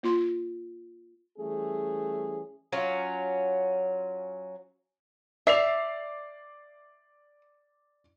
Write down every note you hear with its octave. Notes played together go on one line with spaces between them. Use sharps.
A#3 F4 C6
E3 G3 A3 C#4 G#4
F#3 C#4 F4
D5 E5 C7 F7